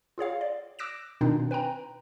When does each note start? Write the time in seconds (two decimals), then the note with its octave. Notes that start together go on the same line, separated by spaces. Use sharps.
0.18 F4 G#4 C#5 F5
0.41 D5
0.79 D6 E6 F#6 A#6 D7 E7
1.21 B2 D#3 C4 D4 D#4 F4
1.51 B4 G5 G#5 A#5